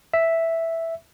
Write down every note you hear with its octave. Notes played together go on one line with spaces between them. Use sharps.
E5